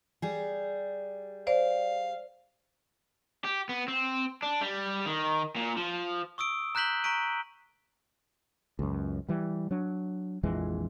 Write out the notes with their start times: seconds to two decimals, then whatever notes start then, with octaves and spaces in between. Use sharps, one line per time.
0.22 G3 G#4
1.47 C5 D5 F5
3.45 G4
3.69 B3
3.88 C4
4.42 D4
4.61 G3
5.06 D#3
5.56 A#2
5.77 F3
6.38 C#6 D#6 E6 D7
6.75 A#5 F#6 G6 B6 F#7 G7
7.04 A#5 C#6 B6 D7 D#7
8.79 C#2 F#2
9.29 E3 G3
9.71 F#3 D4
10.43 A#1 F2 E3 G#3